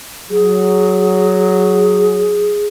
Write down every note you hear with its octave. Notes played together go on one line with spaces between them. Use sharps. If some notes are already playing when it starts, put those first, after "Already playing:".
F#3 G#4